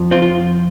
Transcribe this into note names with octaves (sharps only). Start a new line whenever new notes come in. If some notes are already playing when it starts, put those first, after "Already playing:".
Already playing: F2 F3
C4 F4
F4